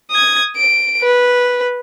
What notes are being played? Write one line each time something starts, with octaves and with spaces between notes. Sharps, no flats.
D#6 G#6
D7
B4